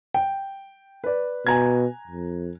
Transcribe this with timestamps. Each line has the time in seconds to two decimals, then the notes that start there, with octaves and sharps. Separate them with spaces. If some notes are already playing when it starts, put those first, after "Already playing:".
0.14 G5
1.04 B4 D5
1.47 B2 G#5 A#5 G#6
2.07 F2